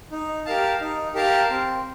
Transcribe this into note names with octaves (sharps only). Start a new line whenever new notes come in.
D#4
G4 A#4 F5 A5
D#4
G4 A#4 F5 A5
C4